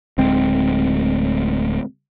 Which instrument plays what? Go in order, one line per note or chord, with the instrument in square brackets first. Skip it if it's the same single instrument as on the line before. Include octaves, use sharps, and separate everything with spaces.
[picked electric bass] D1 D2 G#3 C4